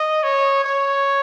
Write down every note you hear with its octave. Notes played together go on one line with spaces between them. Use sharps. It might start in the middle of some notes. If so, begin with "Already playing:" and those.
Already playing: D#5
C#5
C#5